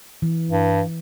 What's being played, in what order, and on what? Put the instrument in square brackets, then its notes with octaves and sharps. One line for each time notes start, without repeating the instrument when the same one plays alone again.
[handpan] E3
[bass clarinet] G2